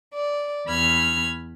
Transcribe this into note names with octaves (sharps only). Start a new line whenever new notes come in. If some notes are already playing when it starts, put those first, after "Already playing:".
D5
E2 B5 F6 G#6